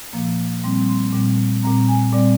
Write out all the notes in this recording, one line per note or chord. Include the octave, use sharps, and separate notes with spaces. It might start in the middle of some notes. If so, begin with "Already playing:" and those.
A#2 F3 A#3
A#2 G3 C4 C6
C6
A#2 G3 C4
A#2 G3 C4 A#5
G#5
A#2 G3 C4 D5